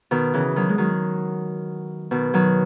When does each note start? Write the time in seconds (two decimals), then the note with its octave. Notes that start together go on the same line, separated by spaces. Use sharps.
0.11 B2 D#3
0.34 C#3 E3
0.56 D#3 F#3
0.69 G#3
0.78 D#3 F#3
2.11 B2 D#3
2.33 D#3 F#3